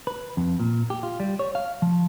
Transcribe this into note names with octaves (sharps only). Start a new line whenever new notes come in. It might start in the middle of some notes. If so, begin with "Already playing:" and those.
B4
F2
A#2
G4
F4
G3
C#5
F5
F3